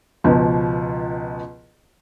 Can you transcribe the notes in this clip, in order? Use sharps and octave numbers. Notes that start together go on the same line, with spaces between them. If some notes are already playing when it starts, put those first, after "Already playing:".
C#2 B2 F3